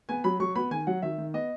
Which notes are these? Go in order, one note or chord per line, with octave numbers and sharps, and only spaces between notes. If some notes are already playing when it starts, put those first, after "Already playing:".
B3 G#5
F#3 B5
F#3 C#6
B3 B5
D#3 G#5
F#3 F#5
D#3 E5
D#3
B3 D#5